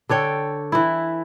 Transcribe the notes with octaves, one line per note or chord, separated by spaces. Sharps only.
D3 A4 C#5 G5
E3 E4